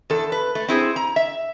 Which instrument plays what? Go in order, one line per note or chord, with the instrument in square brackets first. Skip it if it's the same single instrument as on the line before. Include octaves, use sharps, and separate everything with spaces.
[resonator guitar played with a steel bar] E2 A4
B4
A3
C4 E4 G#4 C5
A#5
E5